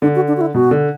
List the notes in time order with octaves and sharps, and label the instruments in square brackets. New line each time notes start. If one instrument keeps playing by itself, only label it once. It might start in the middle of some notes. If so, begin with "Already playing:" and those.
[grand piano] D3 [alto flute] D4
[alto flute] F#4
D4
F#4
E4
[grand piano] B2 [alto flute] F#4
[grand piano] D3